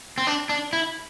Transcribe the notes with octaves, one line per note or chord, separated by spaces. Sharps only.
C4
D4
D4
E4